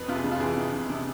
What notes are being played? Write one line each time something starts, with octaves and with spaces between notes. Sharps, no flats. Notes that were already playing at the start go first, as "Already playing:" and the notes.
Already playing: F2 B4
C3 F4
G#4
F2
F4
E3 G#4
C3
C3
C3